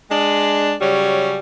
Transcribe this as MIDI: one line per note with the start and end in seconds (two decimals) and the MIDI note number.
0.11 0.74 56
0.11 0.74 62
0.81 1.38 49
0.81 1.38 54
0.81 1.38 55
0.81 1.38 61